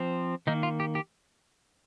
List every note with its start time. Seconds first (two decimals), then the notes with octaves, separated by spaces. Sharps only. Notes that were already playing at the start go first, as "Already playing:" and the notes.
Already playing: F3 C4
0.47 D#3 A#3 D#4
0.63 F4
0.80 G4
0.95 G4